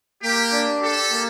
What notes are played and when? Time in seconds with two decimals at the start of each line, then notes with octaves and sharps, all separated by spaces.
0.23 A#3 G4
0.52 D4
0.82 G4 A4
1.11 A#3